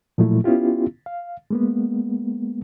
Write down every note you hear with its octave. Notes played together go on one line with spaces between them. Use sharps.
A#2 F3 F#3 A3 E4
B3 C#4 E4 F4 G4
F5
G#3 A#3 B3